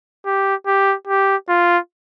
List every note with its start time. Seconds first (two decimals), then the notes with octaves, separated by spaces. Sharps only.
0.26 G4
0.67 G4
1.07 G4
1.49 F4